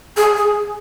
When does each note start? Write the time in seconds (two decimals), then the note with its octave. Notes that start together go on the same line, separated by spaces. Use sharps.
0.17 G#4
0.36 G#4